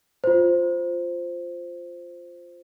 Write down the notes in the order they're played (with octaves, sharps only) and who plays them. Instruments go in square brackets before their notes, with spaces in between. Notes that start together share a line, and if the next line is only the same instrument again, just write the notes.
[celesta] F4 C5